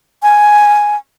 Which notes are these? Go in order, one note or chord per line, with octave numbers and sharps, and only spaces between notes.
G#5